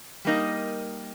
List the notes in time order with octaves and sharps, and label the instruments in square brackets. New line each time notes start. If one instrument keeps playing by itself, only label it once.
[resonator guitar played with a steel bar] G3 A#3 D#4 A#4 D#5